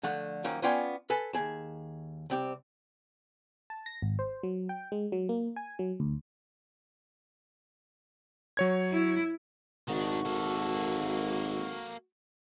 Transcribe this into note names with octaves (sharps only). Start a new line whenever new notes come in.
D3 F3 A3 F#5
D#3 F3 F#3 A#3 C#4
B3 C#4 F4 D5 G5 G#5
A4 B4 G#5 A5
D#2 C#3 G#4 A5
C2 C4 G4
A5
A#6
G#1
C5
F#3
G5
G#3
F#3
A#3
G#5
F#3
D2
F#3 C#5 G#6
E4
G#1 D#3 D4 F#4
A#3 A4